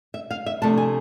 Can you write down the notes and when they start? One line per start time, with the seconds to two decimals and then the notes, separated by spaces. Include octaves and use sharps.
0.14 E5
0.31 F5
0.46 E5
0.62 C3 F3 A3 D4 A5
0.78 G#5